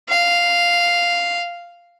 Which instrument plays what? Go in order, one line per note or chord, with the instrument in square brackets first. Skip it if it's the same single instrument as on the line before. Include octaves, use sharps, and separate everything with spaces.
[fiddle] F5